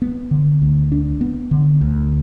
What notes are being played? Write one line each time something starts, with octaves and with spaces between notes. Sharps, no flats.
B3
D3
D2
D4
B3
D3
D2